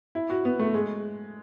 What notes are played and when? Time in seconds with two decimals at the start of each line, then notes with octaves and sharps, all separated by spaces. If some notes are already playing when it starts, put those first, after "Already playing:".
0.15 E4
0.30 F#4
0.45 B3
0.59 A3
0.74 G#3